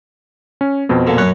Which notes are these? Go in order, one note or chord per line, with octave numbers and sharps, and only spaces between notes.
C#4
F2 B2 C4
A#2 D3
F#2 C#4 C#5 F#6